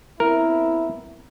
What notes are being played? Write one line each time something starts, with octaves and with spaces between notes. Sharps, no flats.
B3 C4 E4 A#4